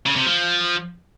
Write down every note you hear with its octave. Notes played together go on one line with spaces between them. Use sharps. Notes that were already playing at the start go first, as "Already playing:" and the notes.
C#3
C3
F3